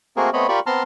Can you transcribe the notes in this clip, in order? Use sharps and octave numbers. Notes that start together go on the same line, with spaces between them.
A3 A#3 C4 F#4 G#4 A#4
A3 B3 C4 C#5 D#5 B5
F4 G4 A#4 D5 B5 C#6
B3 C4 A5 A#5 C6 F6